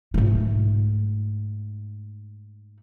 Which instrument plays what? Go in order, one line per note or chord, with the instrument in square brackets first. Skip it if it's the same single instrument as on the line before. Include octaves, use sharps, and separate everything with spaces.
[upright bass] G#2 A3